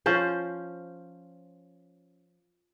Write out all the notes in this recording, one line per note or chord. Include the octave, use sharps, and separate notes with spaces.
F3 C#4 C5